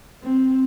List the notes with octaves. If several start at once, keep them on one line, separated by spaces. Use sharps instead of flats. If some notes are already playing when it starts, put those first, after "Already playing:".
C4